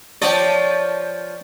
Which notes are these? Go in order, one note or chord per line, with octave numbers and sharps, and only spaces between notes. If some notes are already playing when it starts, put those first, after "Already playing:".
F3 C#5 D5 G5